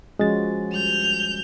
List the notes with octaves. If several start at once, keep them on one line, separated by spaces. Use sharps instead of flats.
F3 G#3 C#4 F#4 A6
G3 G6 F7